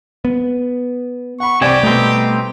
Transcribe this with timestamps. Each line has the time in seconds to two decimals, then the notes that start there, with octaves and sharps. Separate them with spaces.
0.25 B3
1.40 F#5 B5 C#6
1.61 C2 G2 C4 G4 D5 G#5 C#6
1.83 B2 G3 A3 C4 D#4